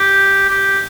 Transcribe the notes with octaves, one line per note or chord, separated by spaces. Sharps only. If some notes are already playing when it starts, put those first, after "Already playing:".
Already playing: G4
G4